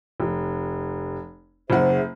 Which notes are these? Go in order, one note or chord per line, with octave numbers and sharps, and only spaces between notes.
F1
F#1 G#4 C5 E5 F#5